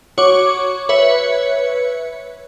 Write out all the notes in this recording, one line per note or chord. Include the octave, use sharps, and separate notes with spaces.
F#4 C#5 C#6 D6
B4 C#5 E5 C#7